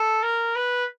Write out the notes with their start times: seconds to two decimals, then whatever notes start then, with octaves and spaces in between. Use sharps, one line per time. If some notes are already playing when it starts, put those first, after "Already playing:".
Already playing: A4
0.23 A#4
0.56 B4